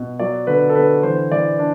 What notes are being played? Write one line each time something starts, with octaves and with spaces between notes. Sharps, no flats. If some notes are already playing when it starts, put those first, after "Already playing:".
Already playing: B2
F#3 D5
D3 B4
A4
D3 B4
E3 C5
E3 D5
D4